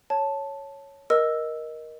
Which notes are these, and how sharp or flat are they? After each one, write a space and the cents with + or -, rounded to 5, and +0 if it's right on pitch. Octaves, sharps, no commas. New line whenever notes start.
C#5 +0 A5 +0
A#4 +15 D#5 +0 E6 +0